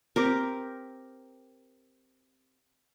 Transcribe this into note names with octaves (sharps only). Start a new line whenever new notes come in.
C4 G4 A#4